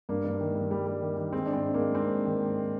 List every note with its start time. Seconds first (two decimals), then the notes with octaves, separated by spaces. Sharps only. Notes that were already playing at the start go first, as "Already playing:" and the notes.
0.09 G2 A#3 D4
0.24 G2
0.41 D#3
0.56 G2
0.71 G3
0.87 G3
1.02 D#3
1.17 D#3
1.33 G#3 C4
1.46 D4
1.49 G#2 C4
1.65 G#2
1.74 A#3
1.79 G#3
1.95 G#2 C4
2.11 G#2
2.26 D#3
2.41 G#2